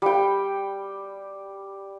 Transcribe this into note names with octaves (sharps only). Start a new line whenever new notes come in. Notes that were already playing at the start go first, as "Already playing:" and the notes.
G3 G5